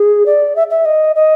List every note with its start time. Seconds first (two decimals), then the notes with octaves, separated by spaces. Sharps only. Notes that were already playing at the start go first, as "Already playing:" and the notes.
Already playing: G#4
0.26 D5
0.56 E5
0.71 E5
0.85 D#5
1.16 D#5